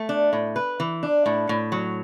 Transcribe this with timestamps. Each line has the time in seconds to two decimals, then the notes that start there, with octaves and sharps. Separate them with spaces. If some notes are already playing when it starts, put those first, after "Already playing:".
Already playing: A3
0.09 D4
0.33 A2
0.56 B4
0.80 E3
1.03 D4
1.26 A2
1.49 A2
1.72 F#3